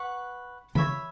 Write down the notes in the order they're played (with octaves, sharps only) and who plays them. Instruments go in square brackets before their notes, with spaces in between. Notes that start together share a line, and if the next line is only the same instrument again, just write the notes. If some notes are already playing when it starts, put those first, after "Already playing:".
Already playing: [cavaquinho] B4 F#5 C#6
[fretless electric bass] C#3 E3 [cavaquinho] C#5 E5 B5